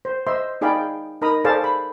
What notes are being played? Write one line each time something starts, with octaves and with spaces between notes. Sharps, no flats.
C5
C5 D#5 E5 C6
D#4 G#4 D5 F5 G5 B5
D#4 A#4 A#5 B5 D#6
G#4 A4 C5 D5 F5 A5
B5